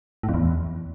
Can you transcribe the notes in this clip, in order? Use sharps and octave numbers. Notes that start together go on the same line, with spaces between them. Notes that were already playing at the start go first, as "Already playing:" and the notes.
A2
F2
E2